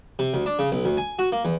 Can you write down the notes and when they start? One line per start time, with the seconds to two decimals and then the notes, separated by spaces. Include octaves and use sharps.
0.19 C3
0.34 D2
0.46 D4
0.59 C#3
0.72 B1
0.85 D2
0.97 G#5
1.19 F#4
1.32 A#3
1.45 E2